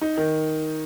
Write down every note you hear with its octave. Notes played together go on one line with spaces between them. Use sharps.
D#4
D#3